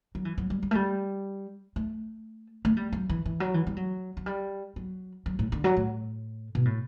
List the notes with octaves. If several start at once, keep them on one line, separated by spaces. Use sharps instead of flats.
F#3
E3
F#3
G3
G3
A3
G3
A3
A3
G3
F#3
E3
E3
F#3
E3
G3
F#3
F#3
G3
F#3
F#3
A2
D3
F#3
A2
B2
A2